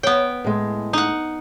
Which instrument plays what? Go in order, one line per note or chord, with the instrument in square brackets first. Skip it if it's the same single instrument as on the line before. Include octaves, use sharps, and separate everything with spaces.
[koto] B3 G5 [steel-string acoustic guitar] C#5
[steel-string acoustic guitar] A2 G#3
[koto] D#4 F#5